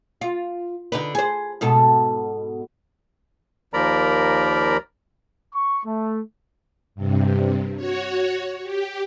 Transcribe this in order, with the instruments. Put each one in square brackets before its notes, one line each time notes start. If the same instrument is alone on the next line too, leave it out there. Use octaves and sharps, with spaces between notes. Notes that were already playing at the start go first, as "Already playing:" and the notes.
[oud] F4
D3 D#4 B4
G#4 C5
G#2 B2 A4
[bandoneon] D#2 F3 A#4 D5 A#5 B5
[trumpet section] C#6
A3
[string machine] G2 C3
F#4 C#5
G4